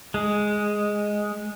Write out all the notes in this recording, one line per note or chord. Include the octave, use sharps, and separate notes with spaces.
G#3